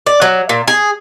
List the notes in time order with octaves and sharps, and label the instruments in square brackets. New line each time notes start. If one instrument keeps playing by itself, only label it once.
[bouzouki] D5
F#3
A#2
G#4